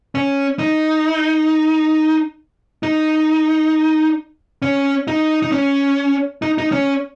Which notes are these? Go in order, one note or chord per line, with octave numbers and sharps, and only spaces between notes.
C#4
D#4
D#4
C#4
D#4
D#4
C#4
D#4
D#4
C#4